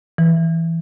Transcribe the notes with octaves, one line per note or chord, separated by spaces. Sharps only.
E3